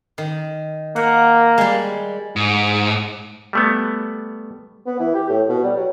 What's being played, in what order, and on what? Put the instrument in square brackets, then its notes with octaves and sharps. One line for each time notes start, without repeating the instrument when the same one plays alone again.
[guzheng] D#3
[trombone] A#3 [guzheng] F#5
[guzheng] G3 G#3
[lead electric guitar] G#2
[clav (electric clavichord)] G3 A3 B3
[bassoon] B3
E3
G4
A2
B2
G3
F#3